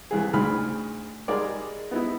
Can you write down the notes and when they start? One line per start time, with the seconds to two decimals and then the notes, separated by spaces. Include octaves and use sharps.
0.11 C2 E3 G#4
0.33 D2 G#2 G#4 B5 F6
1.28 G3 G#3 D#4 G#4 A#4 D5
1.91 B3 D#4 E4